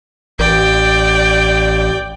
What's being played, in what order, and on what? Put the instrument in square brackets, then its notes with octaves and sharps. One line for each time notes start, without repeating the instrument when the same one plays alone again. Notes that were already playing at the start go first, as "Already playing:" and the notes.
[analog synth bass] A1 [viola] D5 G5